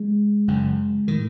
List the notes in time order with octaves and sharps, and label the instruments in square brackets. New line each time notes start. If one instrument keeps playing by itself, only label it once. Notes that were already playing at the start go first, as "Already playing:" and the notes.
Already playing: [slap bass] G#3
F#1 F#2 C#3
A2 D#3